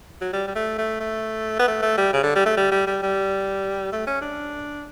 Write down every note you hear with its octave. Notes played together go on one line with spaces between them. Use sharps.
F#3
G3
G3
A3
A3
A3
B3
A3
A3
G3
C#3
D3
G3
A3
G3
G3
G3
G3
A3
C#4
D4